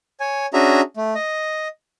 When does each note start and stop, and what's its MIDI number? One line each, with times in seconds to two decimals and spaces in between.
0.20 0.46 73
0.20 0.46 80
0.54 0.81 61
0.54 0.81 62
0.54 0.81 66
0.54 0.81 68
0.54 0.81 76
0.54 0.81 82
0.97 1.14 57
1.15 1.68 75